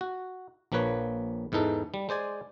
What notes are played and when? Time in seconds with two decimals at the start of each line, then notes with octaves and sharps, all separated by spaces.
0.01 F#4
0.72 A#1 F3 A#3 B4 C#5
1.52 E2 G#2 E3 D#4 A4
1.94 G3
2.09 G#3 C5 D5 G#5